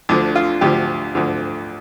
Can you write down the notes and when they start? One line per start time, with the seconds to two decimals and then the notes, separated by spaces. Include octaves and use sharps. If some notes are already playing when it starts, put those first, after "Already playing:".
0.09 D2 D3 F3 D4
0.35 F4
0.61 D2 D3 F3 G4
1.15 D2 D3 F3